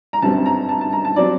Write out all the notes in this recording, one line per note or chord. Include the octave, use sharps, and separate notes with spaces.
A#5
G1 F#2 D3 G3 C4 A5
A#5
A5
A5
A#5
A5
F#3 C4 D5